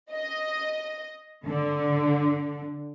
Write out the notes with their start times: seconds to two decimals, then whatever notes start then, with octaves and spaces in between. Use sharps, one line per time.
0.12 D#5
1.45 D3